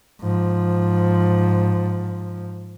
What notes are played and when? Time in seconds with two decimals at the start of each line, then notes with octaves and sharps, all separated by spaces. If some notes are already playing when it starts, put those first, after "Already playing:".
0.20 G#2 F3